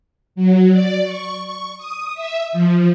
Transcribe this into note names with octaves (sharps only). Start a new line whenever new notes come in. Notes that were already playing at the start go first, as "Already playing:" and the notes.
F#3
D5
C#6
C#6
D#6
E5
F3